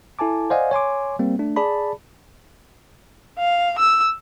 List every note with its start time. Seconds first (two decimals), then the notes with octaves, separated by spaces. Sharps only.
0.19 E4 A4 G#5 A5 D6
0.50 C5 D5 D#5 F5 F#5 G#5
0.71 C#5 G#5 C6 D6
1.19 G3 A#3 C4
1.39 A3 D4
1.56 G#4 D5 A5 B5
3.39 F5
3.79 E6